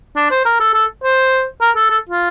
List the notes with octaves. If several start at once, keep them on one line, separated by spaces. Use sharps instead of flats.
D4
C5
A#4
A4
A4
C5
A#4
A4
A4
F4